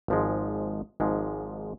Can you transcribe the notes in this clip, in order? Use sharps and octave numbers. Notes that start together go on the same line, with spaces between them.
G#1 G#2 F3 G#3
G#1 G#2 F3 G#3